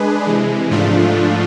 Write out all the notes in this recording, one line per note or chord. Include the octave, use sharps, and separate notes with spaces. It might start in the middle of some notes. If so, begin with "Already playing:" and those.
Already playing: G#3 D4 G#4 B4
C3 E3 G#3
G#2 F3 A3 D4 F4